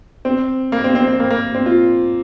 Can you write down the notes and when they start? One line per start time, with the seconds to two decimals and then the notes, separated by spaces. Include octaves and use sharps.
0.25 C4
0.72 A#3
0.84 C4
0.95 C4
1.07 C4
1.20 A#3
1.30 A#3
1.55 C4
1.66 F4